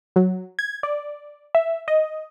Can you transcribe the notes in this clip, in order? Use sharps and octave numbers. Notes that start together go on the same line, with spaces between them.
F#3
G#6
D5
E5
D#5